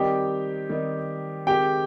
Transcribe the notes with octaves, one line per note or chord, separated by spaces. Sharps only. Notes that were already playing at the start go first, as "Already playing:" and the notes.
Already playing: D#3 G3 C4 D#4 G4 G5
D#3 G3 C4 D#4
D#3 G#3 C4 G4 G5